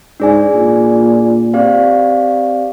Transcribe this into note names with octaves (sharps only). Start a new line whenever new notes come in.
G#2 D4 G#4 D5 G#5
A#2
C4 G4 D5 F5